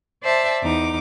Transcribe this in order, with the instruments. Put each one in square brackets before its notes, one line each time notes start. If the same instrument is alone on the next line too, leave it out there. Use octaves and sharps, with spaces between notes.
[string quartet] C5 D5 E5 A5
E2 D#4 D6